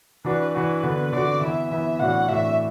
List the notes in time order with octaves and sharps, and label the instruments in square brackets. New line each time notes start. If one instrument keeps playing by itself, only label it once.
[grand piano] E3 D4 F#4 [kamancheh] B4
[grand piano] E3 D4 F#4 [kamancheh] B4
[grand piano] D3 B3 F#4
[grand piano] D3 B3 F#4 [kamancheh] D5
[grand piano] E3 B3 E4 [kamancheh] E5
[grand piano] E3 B3 E4 [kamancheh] E5
[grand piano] A2 E3 D4 F#4 [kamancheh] F#5
[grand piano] A2 E3 D4 F#4 [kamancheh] E5